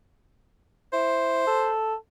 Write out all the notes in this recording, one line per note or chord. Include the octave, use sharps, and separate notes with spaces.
E4 C5
A4